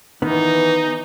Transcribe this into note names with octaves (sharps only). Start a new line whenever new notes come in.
D#3 E3 B3 D#4